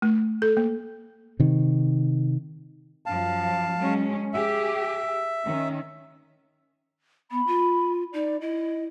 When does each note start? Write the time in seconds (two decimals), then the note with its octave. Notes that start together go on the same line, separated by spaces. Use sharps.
0.02 A3
0.42 A4
0.57 A#3
1.40 C3 D#3
3.06 F#2 F3 F5 A5
3.79 F#3 G#3 C#4
4.33 G4 G#4 E5
5.45 D#3 C#4
7.31 B3 B5
7.47 F4
8.13 D#4 D5
8.41 E4 D#5